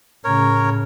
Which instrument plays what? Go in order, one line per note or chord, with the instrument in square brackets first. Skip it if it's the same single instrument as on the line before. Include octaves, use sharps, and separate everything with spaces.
[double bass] A2 C#3 [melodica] A#4 C#5